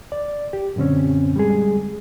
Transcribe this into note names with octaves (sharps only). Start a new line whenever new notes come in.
D5
G4
F#2 A#2 D3 C4 C#4
G3 G#3 G#4